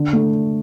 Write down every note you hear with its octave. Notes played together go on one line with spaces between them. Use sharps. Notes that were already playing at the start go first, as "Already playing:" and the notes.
Already playing: D3
A3